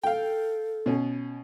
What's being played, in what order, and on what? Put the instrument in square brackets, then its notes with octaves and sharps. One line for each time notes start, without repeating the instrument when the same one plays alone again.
[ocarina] A4 [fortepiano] F5 G5
[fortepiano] B2 C#4